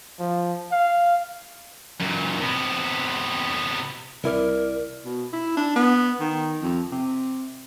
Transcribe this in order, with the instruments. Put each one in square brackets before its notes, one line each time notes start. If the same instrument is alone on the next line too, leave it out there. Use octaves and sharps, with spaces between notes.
[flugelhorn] F3
F5
[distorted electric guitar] F#2 A#2
C3 B3
[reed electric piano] C2 E4 D5 [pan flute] A#4
[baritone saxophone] B2
E4
D4
B3
D#3
F2
C3